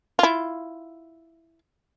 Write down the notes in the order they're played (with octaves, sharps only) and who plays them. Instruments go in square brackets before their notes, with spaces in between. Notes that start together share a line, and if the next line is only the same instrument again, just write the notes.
[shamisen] E4 F4